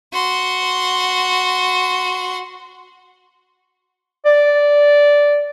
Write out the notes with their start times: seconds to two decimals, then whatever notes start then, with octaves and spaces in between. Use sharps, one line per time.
0.14 F#4 C6
4.26 D5